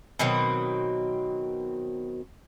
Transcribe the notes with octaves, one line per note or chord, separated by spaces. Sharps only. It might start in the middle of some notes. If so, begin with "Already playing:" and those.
B2 D#3 F#3 C4